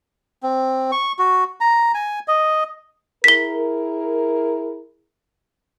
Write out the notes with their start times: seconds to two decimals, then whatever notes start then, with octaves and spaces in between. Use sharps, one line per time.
0.43 C4
0.92 C#6
1.19 F#4
1.61 A#5
1.94 G#5
2.28 D#5
3.24 E4 G#4 A#4 B6 G7